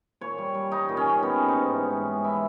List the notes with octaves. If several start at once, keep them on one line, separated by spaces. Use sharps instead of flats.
A#2 C#5
G3
G3
G3 D#4
A#2
C#4
G3
G#3 B3
G#2
D#4
G#2
E3
G#2
G#3
E4